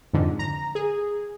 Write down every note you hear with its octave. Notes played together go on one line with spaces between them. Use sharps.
F2 G#2 D3
A#5
G#4